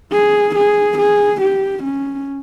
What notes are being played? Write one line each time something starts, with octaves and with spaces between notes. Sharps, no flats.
G#4
G#4
G#4
G4
C#4